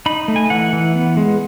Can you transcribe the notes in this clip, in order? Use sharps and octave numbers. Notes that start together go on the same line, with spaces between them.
D#4 B5
A3
G#5
E3 F#5
E3
B3
G#3